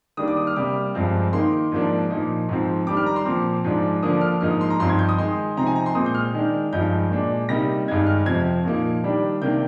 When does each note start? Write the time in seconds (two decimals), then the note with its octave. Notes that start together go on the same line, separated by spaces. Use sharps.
0.17 D#3 G3 A#3 D4 D#6
0.28 D6
0.37 D#6
0.47 F6
0.56 C3 G3 A#3 D6
0.95 G2 F3 G#3 C4
1.33 D#3 A#3 D#4 C6
1.71 G#2 F3 A#3 D4
2.10 A#2 F3 A#3 D#4
2.49 G#2 F3 C4
2.87 D#3 G3 D4 D6
2.97 F6
3.06 A#5
3.16 C6
3.25 A#2 F3 C4 D6
3.64 G#2 F3 G#3 D4
4.03 D3 F3 A#3 D4 D#6
4.21 F6
4.41 G#2 F3 A#3 D#4 F6
4.51 D#6
4.61 C6
4.70 A#5
4.80 G2 F3 C4 D#4 C6
4.89 G#6
4.99 G6
5.09 D#6
5.18 D#3 G#3 D#4 C6
5.57 C3 F3 C4 D#4 A#5
5.67 G#5
5.75 A#5
5.86 C6
5.95 A#2 G#3 C4 D#6
6.06 G6
6.15 F6
6.34 D#3 G#3 D4
6.73 G2 F3 G#3 D#4 G6
7.11 A#2 G#3 D4
7.49 C3 G3 A#3 D#4 A#6
7.88 G2 D#3 G#3 D#4 G#6
8.07 F6
8.26 F2 C3 F3 C4 G#6
8.65 A#2 F3 A#3 D#4
9.04 D#3 G3 D4
9.41 C3 D#3 A#3 D4 G6